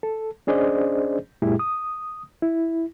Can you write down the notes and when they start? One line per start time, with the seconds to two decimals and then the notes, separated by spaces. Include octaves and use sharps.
0.03 A4
0.47 C#4 D4 G#4 C5 D5 D#5
1.42 F#2 A#2 G#3 E4 G4 G#4
1.59 D#6
2.42 E4